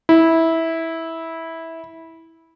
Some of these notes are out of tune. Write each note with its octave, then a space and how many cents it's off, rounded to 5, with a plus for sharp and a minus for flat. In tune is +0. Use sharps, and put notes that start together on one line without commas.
E4 -15